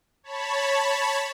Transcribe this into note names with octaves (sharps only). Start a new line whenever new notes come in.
C#5 A5 B5